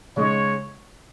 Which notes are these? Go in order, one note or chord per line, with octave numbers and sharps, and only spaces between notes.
C#3 G#3 D#4 C#5